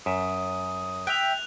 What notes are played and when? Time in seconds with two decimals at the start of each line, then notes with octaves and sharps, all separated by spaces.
0.06 F#2 E5 D#6
1.07 E5 G5 F#6 F7